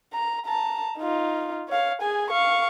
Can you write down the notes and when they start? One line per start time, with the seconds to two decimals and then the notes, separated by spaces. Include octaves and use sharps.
0.13 A#5
0.46 A5 A#5
0.99 D#4 F4
1.69 C#5 F5
2.01 G#4 G#5
2.31 F5 C#6